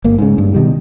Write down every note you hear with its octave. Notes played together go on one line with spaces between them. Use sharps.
G1 A#3
G#2 C#3
G2
B2 D#3 G3